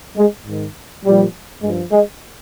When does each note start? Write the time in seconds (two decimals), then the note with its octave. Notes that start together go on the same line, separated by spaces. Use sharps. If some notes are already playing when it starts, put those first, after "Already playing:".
0.16 G#3
0.46 G#2 D#3
1.04 A#2 F3 G3
1.63 G2 F3 G#3
1.91 G#3